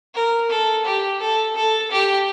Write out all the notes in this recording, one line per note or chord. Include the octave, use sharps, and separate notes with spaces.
A#4
A4
G4
A4
A4
G4